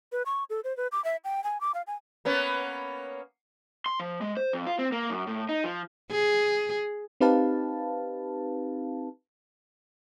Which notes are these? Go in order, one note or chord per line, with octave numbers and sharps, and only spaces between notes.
B4
C#6
A4
C5
B4
D6
E5
G5
G#5
D6
F5
G#5
A#3 B3 C#4
C6
F3
G#3
C5
F2
F4
C4
A#3
F#2
A2
D#4
F3
G#4
C4 D#4 G4 B4 F5 A5